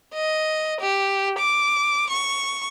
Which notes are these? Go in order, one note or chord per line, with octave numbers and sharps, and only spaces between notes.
D#5
G4
D6
C#6